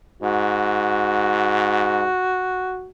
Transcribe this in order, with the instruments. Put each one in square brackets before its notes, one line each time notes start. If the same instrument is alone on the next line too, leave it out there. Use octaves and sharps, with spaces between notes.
[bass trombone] G#2 [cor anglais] F#4